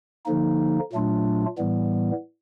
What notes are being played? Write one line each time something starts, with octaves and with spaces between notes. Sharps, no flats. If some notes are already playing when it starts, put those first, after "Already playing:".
D3 F3 A#3 D#4
A#2 F#3 A3 D4 F4
A2 E3 G3 B3